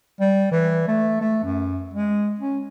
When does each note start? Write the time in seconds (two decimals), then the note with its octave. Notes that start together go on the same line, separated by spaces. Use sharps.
0.20 G3
0.52 E3
0.88 A3
1.21 A3
1.44 F#2
1.94 G#3
2.39 C#4